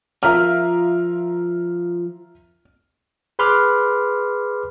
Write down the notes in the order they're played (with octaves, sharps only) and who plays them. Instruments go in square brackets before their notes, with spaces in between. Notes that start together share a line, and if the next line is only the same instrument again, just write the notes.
[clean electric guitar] F3 [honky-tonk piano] F4 A#4 E5 [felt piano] F6
[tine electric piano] G#4 B4 B5 C6 D6 F6